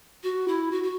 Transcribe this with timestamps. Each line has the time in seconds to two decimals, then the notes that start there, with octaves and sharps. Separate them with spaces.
0.23 F#4
0.48 E4
0.72 F#4
0.83 F#4